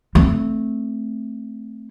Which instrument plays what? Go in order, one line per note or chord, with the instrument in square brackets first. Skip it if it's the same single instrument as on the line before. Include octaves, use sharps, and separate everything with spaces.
[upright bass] A3 C4